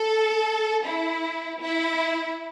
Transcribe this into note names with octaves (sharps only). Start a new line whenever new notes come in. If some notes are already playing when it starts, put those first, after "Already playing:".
Already playing: A4
E4
E4